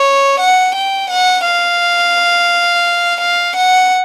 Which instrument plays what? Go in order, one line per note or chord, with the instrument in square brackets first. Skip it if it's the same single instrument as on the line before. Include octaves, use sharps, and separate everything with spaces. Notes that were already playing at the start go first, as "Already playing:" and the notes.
Already playing: [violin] C#5
F#5
G5
F#5
F5
F5
F#5